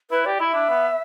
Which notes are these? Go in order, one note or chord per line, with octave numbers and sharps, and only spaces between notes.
E4 B4
G4 D5
E4 E5
D4
B3